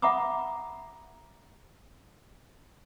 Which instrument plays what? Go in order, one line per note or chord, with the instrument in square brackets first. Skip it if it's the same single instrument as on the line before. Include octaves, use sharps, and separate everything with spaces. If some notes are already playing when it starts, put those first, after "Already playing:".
[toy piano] E5 F#5 A#5 B5 D6 D#6